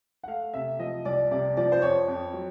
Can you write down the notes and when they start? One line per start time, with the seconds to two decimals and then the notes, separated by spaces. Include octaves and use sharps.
0.23 F#5
0.28 A3 F5
0.54 C3 E5
0.79 F3 D#5
1.05 C2 D5
1.31 C3 D5
1.57 F3 D5
1.72 C5
1.82 F2 C#5
2.08 F2
2.33 F#3